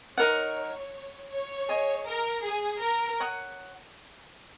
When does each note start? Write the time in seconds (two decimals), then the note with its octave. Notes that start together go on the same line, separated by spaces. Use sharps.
0.17 D#4 A#4 C#5 F#5
1.31 C#5
1.69 G#4 D#5 G#5 C#6
2.07 A#4
2.44 G#4
2.81 A#4
3.20 C#5 F#5 D#6